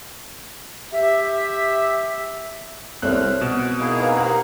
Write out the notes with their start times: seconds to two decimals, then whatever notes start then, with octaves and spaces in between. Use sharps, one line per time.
0.93 G4 E5
3.02 C2 C4 A4 C#5 F6 F#6
3.41 B2 E7
3.80 A#3 D#4 E4 G#4
4.00 B4 F5 A#5
4.16 A#3 C4 G4 A#4 F#5